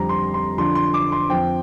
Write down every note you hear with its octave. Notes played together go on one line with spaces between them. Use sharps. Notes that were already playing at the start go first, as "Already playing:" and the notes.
Already playing: F2 D3 G3 C4 A#5
C6
C6
F2 D3 F3 D4 C6
C6
D6
C6
F2 F3 C4 G5